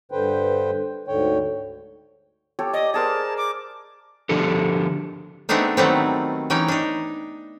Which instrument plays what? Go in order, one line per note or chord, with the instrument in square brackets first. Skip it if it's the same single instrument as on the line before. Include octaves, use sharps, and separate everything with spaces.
[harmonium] G2 D3 B4 C5 G5
D2 G#2 D3 C#5 G5
[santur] G4 A4 C#5
[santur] D5 [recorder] D#5
[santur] G#4 A#4 C5 [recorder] A5
[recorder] D6
[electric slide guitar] D3 F3 D4 G4 A4
[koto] G#3 A3 B3 C4 D4 D#4
D#3 F#3 G3 A3 B3 C4
E3 C#4 D#4 G5
D4 D#4